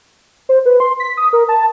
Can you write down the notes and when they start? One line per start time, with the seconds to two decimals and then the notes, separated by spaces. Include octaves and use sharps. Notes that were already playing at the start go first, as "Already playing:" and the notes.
0.49 C5
0.66 B4
0.80 C6
1.00 B6
1.17 D#6
1.33 A#4
1.49 A5